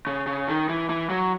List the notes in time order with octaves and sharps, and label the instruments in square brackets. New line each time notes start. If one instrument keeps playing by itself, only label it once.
[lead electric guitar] C#3
C#3
D#3
E3
E3
F#3